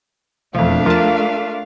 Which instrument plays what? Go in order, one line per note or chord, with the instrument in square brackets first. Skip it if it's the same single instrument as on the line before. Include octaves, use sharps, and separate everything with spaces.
[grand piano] E1 F2 [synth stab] E3 F3 [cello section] A3 D4 [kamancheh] F5
[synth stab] F3 A5 [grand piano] F4 A#4